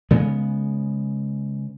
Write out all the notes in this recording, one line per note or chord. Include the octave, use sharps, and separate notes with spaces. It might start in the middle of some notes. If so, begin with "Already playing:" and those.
C#3 G#3 B3